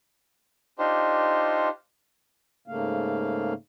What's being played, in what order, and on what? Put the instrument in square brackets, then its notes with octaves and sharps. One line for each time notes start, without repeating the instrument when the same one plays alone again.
[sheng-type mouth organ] D4 D#4 F4 G4 C5
[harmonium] G#2 C#3 A3 A#3 F5